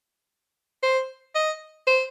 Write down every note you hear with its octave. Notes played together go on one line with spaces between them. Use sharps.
C5
D#5
C5